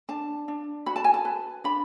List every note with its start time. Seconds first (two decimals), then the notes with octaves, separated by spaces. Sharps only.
0.09 D4 A5
0.48 D4
0.86 F#4 B5
0.96 A5
1.04 G#5
1.14 A5
1.25 B4
1.64 D4 B5